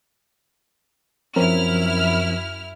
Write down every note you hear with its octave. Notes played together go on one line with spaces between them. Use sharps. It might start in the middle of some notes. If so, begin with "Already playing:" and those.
F#2 F3 C4 C#4 E4 A#4 F6